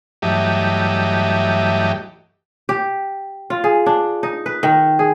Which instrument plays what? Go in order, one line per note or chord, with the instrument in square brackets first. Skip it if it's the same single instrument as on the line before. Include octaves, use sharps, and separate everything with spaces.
[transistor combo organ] G2 E3 F#3 A3 G4 D#5
[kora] G4
F4
G#4
D4
D#4
B4
D#3
G#4